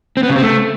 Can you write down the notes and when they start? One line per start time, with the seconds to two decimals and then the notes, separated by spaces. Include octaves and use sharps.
0.17 C4
0.23 B3
0.29 C#3
0.36 C4
0.42 A3